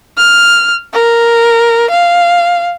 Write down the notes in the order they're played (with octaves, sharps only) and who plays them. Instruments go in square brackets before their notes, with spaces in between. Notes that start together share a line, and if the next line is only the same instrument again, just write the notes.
[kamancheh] F6
A#4
F5